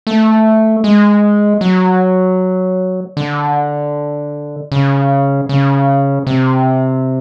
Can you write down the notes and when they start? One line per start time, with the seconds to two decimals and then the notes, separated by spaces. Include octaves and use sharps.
0.07 A3
0.84 G#3
1.61 F#3
3.17 D3
4.72 C#3
5.49 C#3
6.27 C3